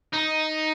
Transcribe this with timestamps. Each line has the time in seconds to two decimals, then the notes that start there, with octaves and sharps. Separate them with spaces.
0.13 D#4